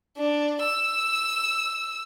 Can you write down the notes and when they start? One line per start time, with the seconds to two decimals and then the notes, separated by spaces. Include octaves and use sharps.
0.17 D4
0.62 E6